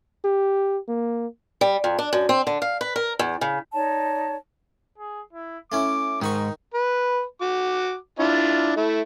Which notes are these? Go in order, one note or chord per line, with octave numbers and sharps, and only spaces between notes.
G4
A#3
G3
F2
D4
F#2
C4
D3
F5
B4
A#4
E2
C#3
D#4 C#5 D5 A5
G#4
E4
A3 C#4 E4 D6
G#2 D#3 D#4 B5 C#6
B4
F#4 D6
D4 E4 F4
A3 E4